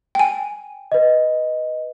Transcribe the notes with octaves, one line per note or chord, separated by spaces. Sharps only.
G5 G#5
B4 D#5